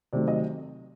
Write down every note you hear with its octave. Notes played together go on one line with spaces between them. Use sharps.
C3 D#3 F#3 A3 D5
D#5